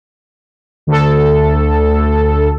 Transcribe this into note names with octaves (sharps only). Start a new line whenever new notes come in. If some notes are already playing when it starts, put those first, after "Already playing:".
D2 A4